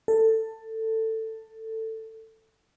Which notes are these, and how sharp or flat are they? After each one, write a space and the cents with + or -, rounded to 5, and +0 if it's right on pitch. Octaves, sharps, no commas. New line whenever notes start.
A4 +15